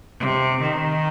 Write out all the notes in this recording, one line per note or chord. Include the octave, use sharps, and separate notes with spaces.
C3
D#3